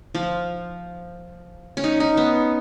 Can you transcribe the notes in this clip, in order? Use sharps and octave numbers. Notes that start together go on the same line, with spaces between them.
F3
C#4
D#4
D#4
B3